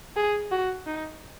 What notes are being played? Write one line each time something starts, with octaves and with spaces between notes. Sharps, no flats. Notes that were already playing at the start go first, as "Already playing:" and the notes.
G#4
F#4
D#4